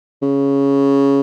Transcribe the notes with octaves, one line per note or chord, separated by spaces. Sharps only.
C#3